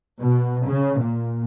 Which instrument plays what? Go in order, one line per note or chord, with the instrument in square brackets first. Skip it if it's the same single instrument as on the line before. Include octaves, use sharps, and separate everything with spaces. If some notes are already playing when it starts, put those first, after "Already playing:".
[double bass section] B2
C#3
A#2